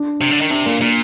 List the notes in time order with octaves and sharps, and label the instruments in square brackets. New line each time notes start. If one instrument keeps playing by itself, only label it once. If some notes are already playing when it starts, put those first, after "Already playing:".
Already playing: [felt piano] D4
[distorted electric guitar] C3 [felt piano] D4
[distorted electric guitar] D3
D#3
[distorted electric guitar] C3 [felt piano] D4
[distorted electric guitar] A#2 [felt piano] A#3
[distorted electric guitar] A#2 [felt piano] A#3